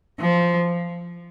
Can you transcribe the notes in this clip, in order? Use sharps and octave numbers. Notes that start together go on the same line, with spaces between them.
F3